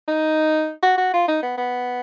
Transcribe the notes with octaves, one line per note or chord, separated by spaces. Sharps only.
D#4
F#4
F#4
F4
D#4
B3
B3